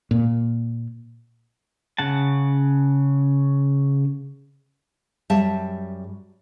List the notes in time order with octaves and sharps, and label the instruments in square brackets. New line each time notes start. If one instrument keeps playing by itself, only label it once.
[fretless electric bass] A#2
[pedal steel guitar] C#3 F#5 A5
[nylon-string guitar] F#2 G3 G4 E5 A5